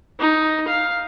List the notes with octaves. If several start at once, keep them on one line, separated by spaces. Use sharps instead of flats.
D#4
F5